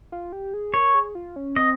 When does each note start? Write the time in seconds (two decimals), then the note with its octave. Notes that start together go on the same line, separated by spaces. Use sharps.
0.12 F4
0.32 G4
0.54 G#4
0.74 A#4 C#5
0.95 G#4
1.15 F4
1.36 C#4
1.56 C4 D#5